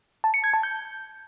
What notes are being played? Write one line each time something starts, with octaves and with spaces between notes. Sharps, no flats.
A5
C#7
G#6
A5
G6